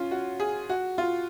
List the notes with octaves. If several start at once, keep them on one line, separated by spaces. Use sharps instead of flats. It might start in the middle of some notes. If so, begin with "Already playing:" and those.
Already playing: C#4 F4
F#4
G#4
F#4
F4